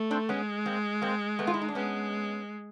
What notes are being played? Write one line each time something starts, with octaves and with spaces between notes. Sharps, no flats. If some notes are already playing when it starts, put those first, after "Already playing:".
Already playing: A3
C4 D4
G#3 B3 C#4
A#3 C4
A#3 C4
A3 B3
F4
E4
D#4
D4
G#3 B3 C#4